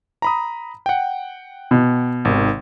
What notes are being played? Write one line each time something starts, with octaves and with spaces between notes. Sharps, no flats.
A#5 B5 D#6
F#5 G5
B2
G#1 C3 D#3